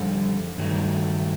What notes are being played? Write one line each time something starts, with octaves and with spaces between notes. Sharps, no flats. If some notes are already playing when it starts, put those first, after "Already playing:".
Already playing: F2 D3 G3 A4
G2 D#3 F#3 A3